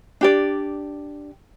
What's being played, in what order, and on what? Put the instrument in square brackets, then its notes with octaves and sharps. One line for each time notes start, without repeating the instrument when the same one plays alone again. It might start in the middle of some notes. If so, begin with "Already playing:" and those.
[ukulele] D4 G4 D5